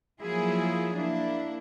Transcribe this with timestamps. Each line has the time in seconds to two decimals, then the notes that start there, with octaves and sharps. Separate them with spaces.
0.21 F3 F#3 A#3 E4 F4 G#4
0.96 A#3 D4 E4